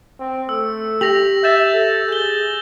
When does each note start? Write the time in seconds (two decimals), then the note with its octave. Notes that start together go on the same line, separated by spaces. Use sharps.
0.20 C4
0.49 A3 E6
1.01 G4 A#6 F7 F#7
1.44 E5 G6 A6 E7
1.73 A4
2.08 G#4 G6 G7